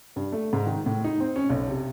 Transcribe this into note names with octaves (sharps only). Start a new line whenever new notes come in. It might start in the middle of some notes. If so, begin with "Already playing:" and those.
G2
A3
G#2
D#3
A2
D#4
C4
C#4
B1
C3